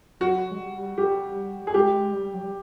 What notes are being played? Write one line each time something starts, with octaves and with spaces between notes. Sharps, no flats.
F#3 F#4
G#3
G3
G3 G4
G3 G#4
G#3 G4
G3
F#3
G3